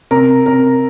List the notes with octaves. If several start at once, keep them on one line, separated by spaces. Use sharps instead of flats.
C3 A#4
C3 A#4